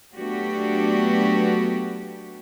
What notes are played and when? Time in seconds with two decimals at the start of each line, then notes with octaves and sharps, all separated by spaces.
0.16 F#3 A3 B3 D4 F#4 G4